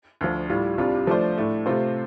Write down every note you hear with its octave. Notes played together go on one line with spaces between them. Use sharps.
D2 D3 F3
A2 G3 F4
C2 C3 G3 D4 F4
F3 A3 D4 F4 C5
A2 A3 D4
C3 A3 C4 F4 C5